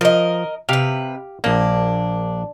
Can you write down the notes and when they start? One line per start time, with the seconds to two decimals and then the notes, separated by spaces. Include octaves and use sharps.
0.01 F3 A#4 D#5
0.69 C3 G4 B4 F5
1.44 A#1 A#3 D4